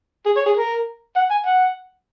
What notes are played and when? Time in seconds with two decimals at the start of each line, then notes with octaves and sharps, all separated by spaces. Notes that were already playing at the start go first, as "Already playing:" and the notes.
0.26 G#4
0.36 C#5
0.46 G#4
0.56 A#4
1.16 F#5
1.31 G#5
1.46 F#5